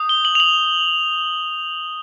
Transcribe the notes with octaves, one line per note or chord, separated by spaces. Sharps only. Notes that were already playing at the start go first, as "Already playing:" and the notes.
Already playing: D#6 G6
G7
F#7
F7
F#7